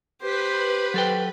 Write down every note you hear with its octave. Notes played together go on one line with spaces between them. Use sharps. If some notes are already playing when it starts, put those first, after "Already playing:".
G4 B4 C5 B5
F#3 A4 G5